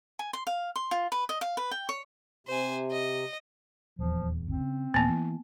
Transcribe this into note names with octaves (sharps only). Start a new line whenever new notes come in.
G#5
C6
F5
C6
F4
B4
D#5
F5
B4
G5
C#5
C3 C5 G#5
D#5
D#1 E2 F3
G1 D#2 C4
C#3
D#1 A#2 E3 A#3 B3
E3